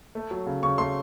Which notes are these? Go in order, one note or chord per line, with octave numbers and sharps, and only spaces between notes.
A3
F#3
C#3
C#3 C#6
A3 C6